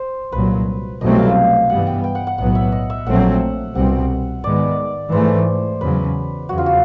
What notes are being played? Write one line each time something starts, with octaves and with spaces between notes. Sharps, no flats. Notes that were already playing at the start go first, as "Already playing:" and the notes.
Already playing: C5
C2 A#2 F#3 B4
C2 B2 F#3 A3 C4 D#5
F5
G2 E3 G3 B3 F#5
G5
G5
F#5
F#5
B1 A2 F#3 B3 F#5
E5
D#5
E5
A#1 A#2 F#3 A3 C4 F#5
C2 B2 G3 C4 F#5
G#2 D#3 G#3 B3 D5
G#2 E3 A3 C5
E2 C#3 F#3 B4
E2 C#3 F#3 F#4
F4
F#4